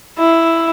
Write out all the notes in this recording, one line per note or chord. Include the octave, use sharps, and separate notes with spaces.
E4